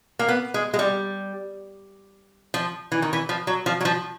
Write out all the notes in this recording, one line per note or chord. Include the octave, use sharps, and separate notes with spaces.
A#3
B3
G#3
G#3
G3
F3
E3
D#3
E3
F3
F#3
F3
F#3
F3